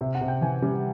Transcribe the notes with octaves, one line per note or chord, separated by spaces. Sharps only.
C3 E5
F#5
C3
G5
E3 G#5
G3